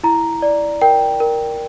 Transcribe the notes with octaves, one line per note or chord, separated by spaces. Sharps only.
E4 A#5
D5
A#4 G5
A#4